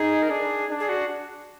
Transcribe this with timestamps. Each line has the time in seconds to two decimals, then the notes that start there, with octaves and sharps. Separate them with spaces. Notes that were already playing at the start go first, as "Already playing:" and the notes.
Already playing: D#4 G#4
0.22 A#4
0.30 D4 G#4
0.70 D4
0.80 G#4
0.89 F#4